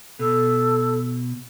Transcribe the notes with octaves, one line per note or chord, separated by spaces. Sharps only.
B2 A4